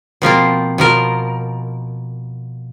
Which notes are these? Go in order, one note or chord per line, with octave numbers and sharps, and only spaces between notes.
B2 F3 A#3 C4
B2 F3 A#4